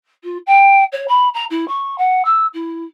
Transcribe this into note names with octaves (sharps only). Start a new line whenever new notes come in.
F4
G5
C#5
B5
A#5
E4
C#6
F#5
E6
E4